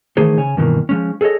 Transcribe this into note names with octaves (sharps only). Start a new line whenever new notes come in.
D#3 E3 A3 D#4 G#4 C5
C#3 C#5 G#5
G2 B2 D#3 E3 G3 A#3
F3 G#3 C#4
G#4 A4 B4 C#5 D#5